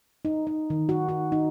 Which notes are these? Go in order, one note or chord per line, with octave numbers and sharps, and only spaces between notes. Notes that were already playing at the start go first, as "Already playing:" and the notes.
D#4
D#4
D#3
F#4
F#4
D#4